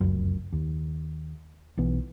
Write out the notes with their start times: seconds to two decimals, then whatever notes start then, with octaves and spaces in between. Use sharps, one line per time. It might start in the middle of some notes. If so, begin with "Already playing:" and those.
0.01 F1 C#2 F#2
0.53 D#2
1.77 B1 E3 B3